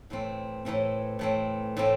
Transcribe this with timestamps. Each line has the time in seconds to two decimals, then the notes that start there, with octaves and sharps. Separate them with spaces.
0.10 A2 E3 A3 C4
0.65 A2 E3 A3 C4
1.19 A2 E3 A3 C4
1.77 A2 E3 A3 C4